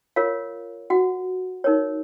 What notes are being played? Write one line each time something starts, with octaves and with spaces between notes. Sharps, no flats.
F4 A#4 C#5 F5
F#4 F#5
D#4 A#4 C#5